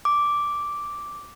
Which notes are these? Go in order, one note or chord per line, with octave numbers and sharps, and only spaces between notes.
D6